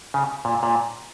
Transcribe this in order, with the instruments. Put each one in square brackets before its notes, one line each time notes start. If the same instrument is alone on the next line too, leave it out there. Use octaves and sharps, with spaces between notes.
[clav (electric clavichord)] C#3
A#2
A#2